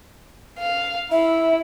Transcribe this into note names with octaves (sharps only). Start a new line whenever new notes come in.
F5
E4 E5